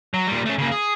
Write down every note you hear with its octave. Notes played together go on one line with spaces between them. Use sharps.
F#3
A#2 G3
A3 C#4
C#3 A#3
G#4